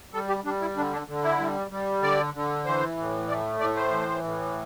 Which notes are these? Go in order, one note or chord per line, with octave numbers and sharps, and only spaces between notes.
G3 A4
G4
G3 D4
E4
D3 D4
D4
D3
E4
G3
G3
D3 D5
D3
E3 C5
A2
A3 D5
A2 D5
C5
E3
A2